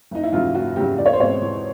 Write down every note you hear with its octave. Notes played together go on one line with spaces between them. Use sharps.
F#1 D#4
E4
E2 C#3 F#3 F4
F#1 F#4
E2 C#3 F#3 G4
E2 D5
C#5
C5
B2 G#3 C4 C#5
E2